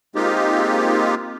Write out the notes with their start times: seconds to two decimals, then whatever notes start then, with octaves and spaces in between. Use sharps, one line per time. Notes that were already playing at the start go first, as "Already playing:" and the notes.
0.15 G#3 A#3 C4 D#4 F4 G4